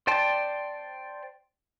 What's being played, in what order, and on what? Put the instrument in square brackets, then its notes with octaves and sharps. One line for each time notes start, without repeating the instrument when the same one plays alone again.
[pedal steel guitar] C5 D5 G5 A5 C6